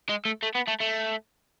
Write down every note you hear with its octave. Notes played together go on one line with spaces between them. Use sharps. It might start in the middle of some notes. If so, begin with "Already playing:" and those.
G#3
A3
A3
B3
A3
A3